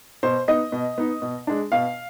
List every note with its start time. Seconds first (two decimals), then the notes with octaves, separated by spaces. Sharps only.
0.23 B2 C5
0.48 B3 D#4 D#5
0.72 B2
0.98 B3 D#4
1.22 B2
1.47 G#3 D4
1.72 B2 F5